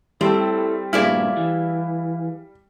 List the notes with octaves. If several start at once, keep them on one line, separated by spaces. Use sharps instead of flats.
G3 C4 E4 A4
G2 A#2 E4 G#4 D5 F5 F6
E3